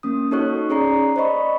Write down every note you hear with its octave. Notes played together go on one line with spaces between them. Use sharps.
A#3 C#4 D#6
D#4 F#4 A4 C#5 C#6 F#6
C#4 G#4 C#5 D5 A#5 C7
C5 D5 D#5 B5 C#6